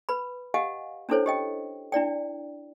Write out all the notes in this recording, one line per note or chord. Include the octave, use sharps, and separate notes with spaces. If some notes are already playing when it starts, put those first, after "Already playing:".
B4 B5
G4 D#5 F5 F#5 G#5
C#4 D4 E4 A4 C5 C#5
G4 D#5 G5
D4 E4 D5 G5